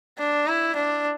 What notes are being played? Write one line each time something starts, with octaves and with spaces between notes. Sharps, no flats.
D4
E4
D4